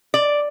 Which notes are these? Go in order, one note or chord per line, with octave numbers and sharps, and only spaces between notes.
D5